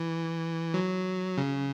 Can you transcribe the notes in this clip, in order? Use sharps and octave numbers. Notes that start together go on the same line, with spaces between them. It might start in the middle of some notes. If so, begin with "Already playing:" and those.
Already playing: E3
F#3
C#3